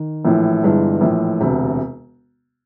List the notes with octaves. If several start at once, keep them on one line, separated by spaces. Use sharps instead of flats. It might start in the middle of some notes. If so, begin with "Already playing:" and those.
Already playing: D#3
A#1 A2 E3
G1 G2 E3 G#3
A#1 A2 E3
E1 D2 C3